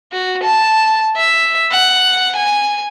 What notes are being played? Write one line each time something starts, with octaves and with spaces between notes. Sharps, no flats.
F#4
A5
E5
F#5
G#5